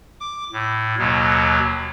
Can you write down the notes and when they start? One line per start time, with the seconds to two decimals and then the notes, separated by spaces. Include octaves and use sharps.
0.20 D6
0.53 A2
0.98 D#2 B2 F#3